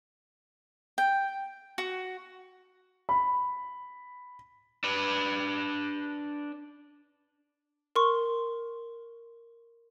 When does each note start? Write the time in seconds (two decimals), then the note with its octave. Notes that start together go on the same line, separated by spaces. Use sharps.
0.98 G5
1.78 F#4
3.09 B5
4.84 D4 B4
7.96 A#4 C6 C#6